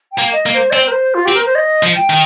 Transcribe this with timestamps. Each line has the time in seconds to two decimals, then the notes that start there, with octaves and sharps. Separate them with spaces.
0.12 G5
0.19 A#3
0.32 D#5
0.46 A#3
0.53 C5
0.70 D#5
0.73 C4 C5
0.87 A#4
0.91 C5
1.14 F4
1.25 C4 G4
1.34 A#4
1.46 C5
1.55 D#5
1.83 F3
1.96 G5
2.10 D#3